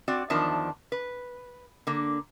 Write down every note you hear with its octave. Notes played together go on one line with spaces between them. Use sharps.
C4 F#4 D5
E2 D#3 F3 D4 A5
B4
D3 A#3